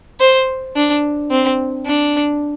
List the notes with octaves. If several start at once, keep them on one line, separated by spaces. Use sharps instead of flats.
C5
D4
C4
D4